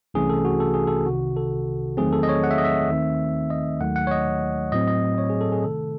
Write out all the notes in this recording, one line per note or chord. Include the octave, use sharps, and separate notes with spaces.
C2 C3 E3 A3 C#4 G#4
A4
F#4
A4
G#4
A4
C2 C3 D#3 F#4
A4
E2 D#3 F#3 A3 C4 G#4
A4
D#5
C#5
F#5
E5
D#5
E5
D#2 D#3 A3 C4
D#5
D#2 D#3 F#3 A3 F#5
F#5
C#5
D#5
A2 F#3 C4 D#5
D#5
C#5
G#4
A4
G#4
C3 D#3 A3 A4